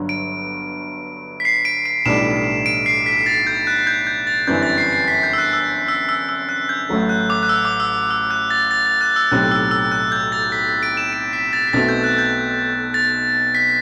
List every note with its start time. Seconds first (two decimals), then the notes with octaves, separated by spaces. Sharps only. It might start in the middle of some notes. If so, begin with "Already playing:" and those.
Already playing: G1 G2 F#3
0.09 D7
1.40 B6
1.45 C7
1.65 D7
1.86 D7
2.06 B1 A2 E3 G3 D4 E7
2.66 D7
2.86 C7
3.06 B6
3.26 A6
3.47 G6
3.67 F#6
3.87 G6
4.07 G6
4.27 A6
4.47 G1 F#2 E3 G3 C4 G6
4.63 A6
4.78 C7
4.93 C7
5.08 B6
5.23 G6
5.33 E6
5.38 F#6
5.53 E6
5.88 E6
6.09 E6
6.29 E6
6.49 F#6
6.69 G6
6.89 A1 A2 F#3 A3
7.09 F#6
7.30 D6
7.43 F#6
7.49 E6
7.65 D6
7.80 E6
8.11 E6
8.31 F#6
8.50 A6
8.71 A6
8.86 A6
9.01 F#6
9.16 E6
9.31 B1 A2 F#3 C4 G4 F#6
9.51 E6
9.71 E6
9.92 F#6
10.12 G6
10.32 A6
10.52 B6
10.83 D7
10.97 E7
11.13 D7
11.33 B6
11.53 A6
11.67 B6
11.73 B1 B2 A3 C4 F#4 A6
11.89 G6
12.04 F#6
12.18 G6
12.94 A6
13.55 B6